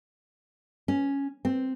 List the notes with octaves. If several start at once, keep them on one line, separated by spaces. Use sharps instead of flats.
C#4
C4